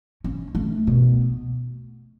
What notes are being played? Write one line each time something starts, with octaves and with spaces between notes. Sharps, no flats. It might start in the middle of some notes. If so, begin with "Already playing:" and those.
C#4
A3
B2